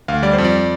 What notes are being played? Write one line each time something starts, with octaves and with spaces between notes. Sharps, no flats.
D2 F5
G3 D5
F2 C5
D5